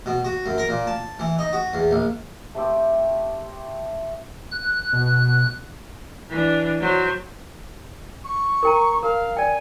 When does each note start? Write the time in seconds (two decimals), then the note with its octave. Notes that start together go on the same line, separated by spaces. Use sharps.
0.06 B2
0.25 F#4
0.46 F#2
0.58 A#4
0.69 A#2
0.87 A5
1.20 E3
1.39 D#4
1.53 F#4
1.73 E2
1.91 A#1
2.55 A3 C4 G4 E6
4.52 F#6
4.93 B2
6.30 E3 D4
6.81 F#3 C5
8.24 C#6
8.63 A#4 G5 A#5
9.03 A#4 F5
9.37 D5 G5 G#5